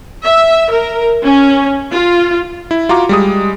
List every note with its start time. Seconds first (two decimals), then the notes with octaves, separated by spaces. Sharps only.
0.25 E5
0.72 A#4
1.24 C#4
1.92 F4
2.71 E4
2.89 F4 F#4 A#5 D6
3.09 G3 G#3 D#6